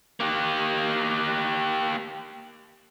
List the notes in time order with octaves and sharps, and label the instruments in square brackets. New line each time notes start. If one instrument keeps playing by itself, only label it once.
[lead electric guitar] A#3 G4